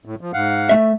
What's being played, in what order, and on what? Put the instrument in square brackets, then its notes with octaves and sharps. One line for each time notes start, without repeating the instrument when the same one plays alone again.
[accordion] A2
F3
G#2 F5 F#5
[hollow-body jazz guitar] A3 E5